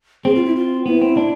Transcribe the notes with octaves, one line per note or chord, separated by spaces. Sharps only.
C4 G#4
F4
E4
F4
B3 E4
C4
D4